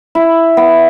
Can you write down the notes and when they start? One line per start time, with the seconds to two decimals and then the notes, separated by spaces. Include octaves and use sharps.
0.15 E4
0.57 B3